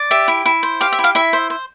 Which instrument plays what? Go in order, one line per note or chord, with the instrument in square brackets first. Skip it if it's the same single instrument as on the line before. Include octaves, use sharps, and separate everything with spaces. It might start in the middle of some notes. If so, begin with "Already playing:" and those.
Already playing: [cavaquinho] D5
G4 E5
E4
E4
C5
G4 F5
E5
E4
F5
E4 E5
C5
C5